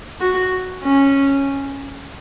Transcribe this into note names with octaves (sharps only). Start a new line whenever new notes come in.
F#4
C#4